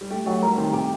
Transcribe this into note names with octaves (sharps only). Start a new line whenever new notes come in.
G3
A3 G4
F#3 A3
G3 A#4
D#3 C4
C3 G4